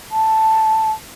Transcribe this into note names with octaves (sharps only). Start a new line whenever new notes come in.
A5